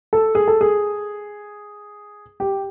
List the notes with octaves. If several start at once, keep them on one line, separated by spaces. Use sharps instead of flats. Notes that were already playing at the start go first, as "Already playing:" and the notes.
A4
G#4
A4
G#4
G4